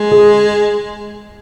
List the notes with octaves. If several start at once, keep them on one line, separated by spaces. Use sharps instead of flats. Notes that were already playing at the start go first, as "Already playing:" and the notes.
Already playing: G#3
G#4